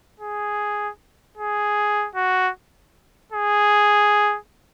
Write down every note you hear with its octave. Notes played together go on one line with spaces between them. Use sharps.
G#4
G#4
F#4
G#4